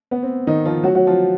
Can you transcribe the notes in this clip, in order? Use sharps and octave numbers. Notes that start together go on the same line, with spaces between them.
B3
C4
D#3 D#4
F3 F4
F#3 F#4
F#3 F#4
F3 F4